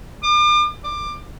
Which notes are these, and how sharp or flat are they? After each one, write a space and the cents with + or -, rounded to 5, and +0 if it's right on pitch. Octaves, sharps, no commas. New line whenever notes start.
D6 +40
D6 +20